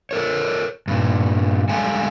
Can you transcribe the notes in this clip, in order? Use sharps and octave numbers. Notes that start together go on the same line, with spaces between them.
A4 A#4 C#5
G2 A#2
G3 G#3 A4 F5 G#5